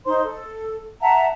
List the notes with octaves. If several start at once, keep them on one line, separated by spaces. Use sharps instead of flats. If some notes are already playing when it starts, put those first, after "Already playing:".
D#4 C5 C6
A4
E5 F#5 A5 A#5